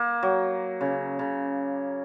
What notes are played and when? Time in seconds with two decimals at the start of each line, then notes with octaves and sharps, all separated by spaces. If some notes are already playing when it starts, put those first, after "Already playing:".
Already playing: A#3
0.23 F#3
0.81 C#3
1.19 C#3